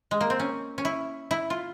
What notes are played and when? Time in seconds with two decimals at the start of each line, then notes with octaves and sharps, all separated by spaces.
0.11 G#3
0.21 A#3
0.30 C4
0.40 C#4
0.78 C#4
0.85 E4
1.31 E4
1.50 F4